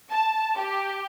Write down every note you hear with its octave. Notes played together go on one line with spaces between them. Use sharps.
A5
G4